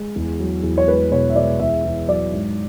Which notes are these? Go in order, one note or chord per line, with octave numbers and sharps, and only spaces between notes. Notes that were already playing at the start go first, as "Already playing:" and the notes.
Already playing: G#3
E2
F#3
E2
C#5
G#3 B4
B2 C#5
E5
G#3 D5
E2 E5
E2
F#3 D5
G#2